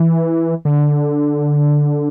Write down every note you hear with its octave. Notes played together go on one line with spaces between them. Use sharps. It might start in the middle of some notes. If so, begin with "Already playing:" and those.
Already playing: E3
D3